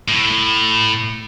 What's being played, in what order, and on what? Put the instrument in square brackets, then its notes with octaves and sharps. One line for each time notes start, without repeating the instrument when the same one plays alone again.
[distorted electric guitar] A2